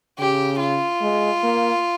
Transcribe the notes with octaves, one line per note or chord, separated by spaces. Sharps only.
C#3 G4
F4
G#3
A#3